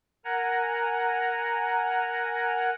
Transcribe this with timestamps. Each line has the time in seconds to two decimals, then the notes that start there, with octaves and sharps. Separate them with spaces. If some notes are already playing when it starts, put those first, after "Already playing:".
0.24 A#4 F#5 G#5 A#5